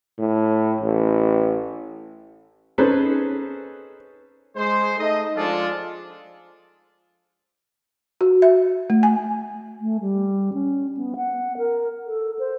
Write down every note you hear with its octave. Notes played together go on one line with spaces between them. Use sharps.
A2
A1
C#4 D#4 G#4 A4 B4 C5
G#3 C5
A3 D#4 D#5
F3 G#3 D4 F4 A4
F#4
E5
A3
G#5
A3
G3
C#4
B3
F#5
A#4
A4
C5